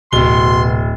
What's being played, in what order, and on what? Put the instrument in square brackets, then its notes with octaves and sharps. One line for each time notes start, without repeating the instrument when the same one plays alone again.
[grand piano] D1 G7 [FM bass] B2 [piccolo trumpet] C6